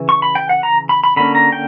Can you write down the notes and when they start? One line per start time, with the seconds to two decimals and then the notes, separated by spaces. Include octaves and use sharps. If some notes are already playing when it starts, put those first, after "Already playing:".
Already playing: C#3 E3
0.09 C#6
0.22 B5
0.35 G5
0.49 F#5
0.63 A#5
0.89 B5
1.04 B5
1.16 D3 A#3 C#4 B5
1.35 A#5
1.52 G5